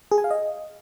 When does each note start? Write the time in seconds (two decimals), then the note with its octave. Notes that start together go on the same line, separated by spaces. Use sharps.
0.12 G#4
0.18 G#5
0.24 F5
0.31 D#5